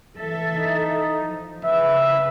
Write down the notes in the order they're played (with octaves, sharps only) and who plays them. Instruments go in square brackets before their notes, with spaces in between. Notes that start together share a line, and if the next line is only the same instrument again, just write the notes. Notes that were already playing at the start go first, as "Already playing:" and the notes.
[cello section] E3 A4 E5
[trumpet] D#4
[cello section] F3
[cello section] C#3 B4 [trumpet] E5